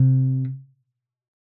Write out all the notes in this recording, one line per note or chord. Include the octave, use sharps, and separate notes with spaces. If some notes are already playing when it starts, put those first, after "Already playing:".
Already playing: C3